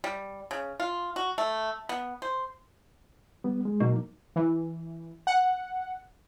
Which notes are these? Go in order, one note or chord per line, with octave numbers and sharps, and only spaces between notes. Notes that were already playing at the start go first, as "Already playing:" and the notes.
G3
C#3
F4
F#4
A3
B3
C5
G3 B3
G#3
B2 F#3 A#3 D#4
E3
F#5